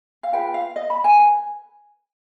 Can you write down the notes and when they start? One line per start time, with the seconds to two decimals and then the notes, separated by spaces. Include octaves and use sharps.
0.23 F5
0.33 F4 G#4 B4 G5
0.54 F5
0.76 D#5
0.90 B5
1.04 G#5
1.19 B4